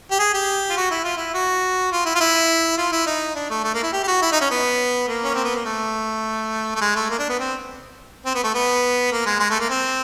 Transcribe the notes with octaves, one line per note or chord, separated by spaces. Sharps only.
G4
G#4
G4
F4
F#4
E4
F4
E4
F#4
F4
E4
F4
E4
F4
E4
D#4
D4
A3
A3
A#3
E4
G4
G4
F#4
E4
D#4
C#4
B3
A#3
C#4
C4
B3
A#3
A3
A3
G#3
A3
A#3
D4
B3
C4
C4
B3
A3
B3
A#3
G#3
G#3
A3
A#3
C4